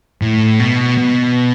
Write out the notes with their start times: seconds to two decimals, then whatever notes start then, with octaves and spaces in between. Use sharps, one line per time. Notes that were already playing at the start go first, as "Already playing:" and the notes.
0.22 A2
0.60 B2
0.98 B2